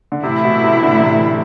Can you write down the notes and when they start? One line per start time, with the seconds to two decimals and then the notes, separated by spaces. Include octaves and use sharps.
0.12 D3
0.23 A2 C3 E3 A3 E4
0.44 B2
0.63 C3
0.83 D3
0.98 D3
1.03 C3